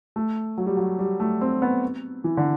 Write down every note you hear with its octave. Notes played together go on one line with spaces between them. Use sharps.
A3
F#3
G3
F#3
G3
A3
C4
B3
E3
D3